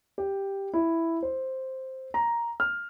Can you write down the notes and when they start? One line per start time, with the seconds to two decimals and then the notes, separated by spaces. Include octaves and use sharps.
0.18 G4
0.74 E4
1.23 C5
2.14 A#5
2.60 F6